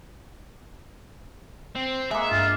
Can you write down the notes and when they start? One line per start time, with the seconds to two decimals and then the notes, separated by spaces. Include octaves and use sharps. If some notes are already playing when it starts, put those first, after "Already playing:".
1.76 C4
2.11 G#3 A#3 E5 F#6 C7 C#7
2.30 G2 F4